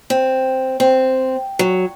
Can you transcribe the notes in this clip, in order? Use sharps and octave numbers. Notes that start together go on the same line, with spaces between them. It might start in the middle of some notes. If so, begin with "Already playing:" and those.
C4
C4
F#3